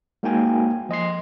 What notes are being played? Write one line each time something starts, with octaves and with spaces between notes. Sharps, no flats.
G#3 A#3 D#4 F#4 G5 G#5
F3 D#5 C6 C7